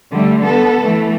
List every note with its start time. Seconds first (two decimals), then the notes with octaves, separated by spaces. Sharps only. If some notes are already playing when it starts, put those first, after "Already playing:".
0.11 D3 G3 A3
0.44 B3 A4
0.82 E3 A3